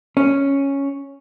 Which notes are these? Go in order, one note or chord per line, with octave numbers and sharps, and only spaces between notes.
C#4